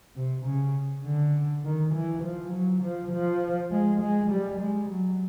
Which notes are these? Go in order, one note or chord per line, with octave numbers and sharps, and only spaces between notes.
C3
C#3
D3
D#3
E3
F3
F#3
F3
F3
G#3
G#3
G3
G#3
F#3